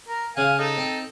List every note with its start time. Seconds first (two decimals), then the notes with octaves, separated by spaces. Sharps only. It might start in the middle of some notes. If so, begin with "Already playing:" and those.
0.08 A#4
0.37 C#3 F5 F#5 G#5
0.59 D#4 A4
0.77 C4